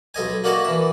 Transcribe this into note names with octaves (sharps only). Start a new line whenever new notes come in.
B1 A4 D#5 G#5
A#3 D4 F#4 D#5 F#5 A5
E3 E5